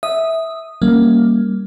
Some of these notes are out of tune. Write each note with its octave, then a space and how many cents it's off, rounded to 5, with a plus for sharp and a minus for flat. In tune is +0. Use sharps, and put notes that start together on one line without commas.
E5 -15 D#6 -5
G3 +0 A#3 +0 C#4 +0